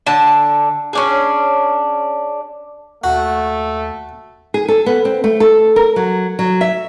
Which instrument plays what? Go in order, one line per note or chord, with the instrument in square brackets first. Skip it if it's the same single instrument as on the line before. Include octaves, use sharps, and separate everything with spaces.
[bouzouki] D3 A5
C#4 D4 G#4
[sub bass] D#2 [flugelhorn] A3 [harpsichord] F#4
[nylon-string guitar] G#4
A4
B3
C4
A3
A4
A#4
F#3
F#3
E5